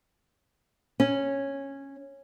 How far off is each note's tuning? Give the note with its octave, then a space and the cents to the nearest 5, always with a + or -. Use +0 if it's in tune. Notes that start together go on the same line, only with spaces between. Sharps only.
C#4 -10